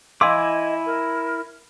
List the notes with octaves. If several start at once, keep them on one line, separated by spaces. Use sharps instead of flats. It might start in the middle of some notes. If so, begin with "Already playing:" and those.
E4 D#5 F5 G#5 C6 D6 E6
A#4